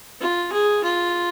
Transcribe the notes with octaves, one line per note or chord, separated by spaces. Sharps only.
F4
G#4
F4